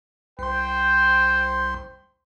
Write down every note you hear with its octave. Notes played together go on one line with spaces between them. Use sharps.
C2 C5 G5 C6